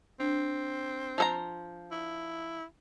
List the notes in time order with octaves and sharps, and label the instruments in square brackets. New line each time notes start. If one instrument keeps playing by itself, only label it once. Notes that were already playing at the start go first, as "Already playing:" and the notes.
[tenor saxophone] C4 [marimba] D4
[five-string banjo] F3 A4 A#5
[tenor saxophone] E4